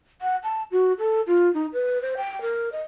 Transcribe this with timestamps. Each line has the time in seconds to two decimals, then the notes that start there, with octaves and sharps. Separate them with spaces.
0.22 F#5
0.44 A5
0.71 F#4
0.99 A4
1.27 F4
1.54 D#4
1.73 B4
2.02 C5
2.17 G5
2.42 A#4
2.72 D#5